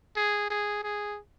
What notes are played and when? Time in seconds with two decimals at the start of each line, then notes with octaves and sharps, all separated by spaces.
0.16 G#4
0.50 G#4
0.83 G#4